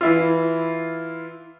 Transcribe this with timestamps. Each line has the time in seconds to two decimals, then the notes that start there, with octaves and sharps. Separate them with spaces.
0.01 E3 E4 F4